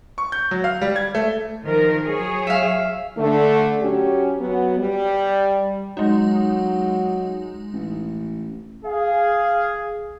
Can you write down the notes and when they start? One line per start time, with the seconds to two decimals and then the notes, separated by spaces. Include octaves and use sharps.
0.18 C#6
0.32 G6
0.51 F#3
0.64 F5
0.81 G3
0.96 G#6
1.15 A3
1.64 D#3 F3 A#4
2.05 F#3 G#4 C#5
2.47 E5 F5
3.17 D3 A3
3.80 F#3 C#4 G4
4.39 F#3 B3
4.79 G3
5.97 F#3 G#3 D#4
7.73 A1
8.86 G#4 F5